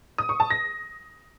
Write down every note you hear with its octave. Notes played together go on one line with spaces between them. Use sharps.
D#6
C#6
A5
A#6